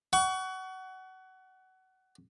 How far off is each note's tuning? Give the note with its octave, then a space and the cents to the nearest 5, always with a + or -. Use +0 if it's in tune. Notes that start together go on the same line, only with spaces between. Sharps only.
F#5 +20 C#6 +30